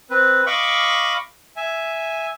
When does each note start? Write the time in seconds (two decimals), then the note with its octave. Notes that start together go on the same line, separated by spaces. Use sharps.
0.10 C4 B4
0.46 D#5 F5 B5 C#6 D6
1.56 E5 G#5